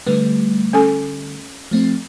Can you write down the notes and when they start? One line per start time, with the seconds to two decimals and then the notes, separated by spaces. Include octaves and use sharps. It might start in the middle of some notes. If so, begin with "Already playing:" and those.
0.06 D3 G3 A3 B4
0.73 C#4 A4 G#5
1.71 F3 A3 C4